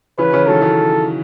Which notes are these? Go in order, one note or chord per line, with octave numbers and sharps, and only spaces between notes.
C#3 E3 B4
C#3 E3
D#3 F#3 A4
C#3 E3